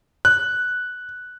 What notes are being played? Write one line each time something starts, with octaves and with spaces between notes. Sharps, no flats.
F#6